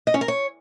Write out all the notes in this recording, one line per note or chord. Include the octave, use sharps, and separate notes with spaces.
D#5
C#4
A#4
C#5